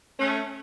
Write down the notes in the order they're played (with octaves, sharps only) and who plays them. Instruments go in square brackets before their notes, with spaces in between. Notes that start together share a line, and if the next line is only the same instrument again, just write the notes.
[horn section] A3 C#4